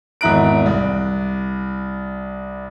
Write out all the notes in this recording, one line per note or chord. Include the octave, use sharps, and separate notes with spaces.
G#1 E2 E4 A#5 F#6 D7
C2